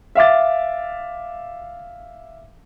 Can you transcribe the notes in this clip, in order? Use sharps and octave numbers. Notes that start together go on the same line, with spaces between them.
E5 F5 D6 A6